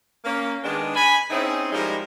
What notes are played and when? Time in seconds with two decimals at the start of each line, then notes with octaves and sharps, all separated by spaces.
0.25 A#3 C#4
0.64 D#3 G#3 B3 D4
0.96 G#5 B5
1.31 C4 C#4 D#4 E4 G#4
1.72 F3 G3 G#3 D#4 E4 A#4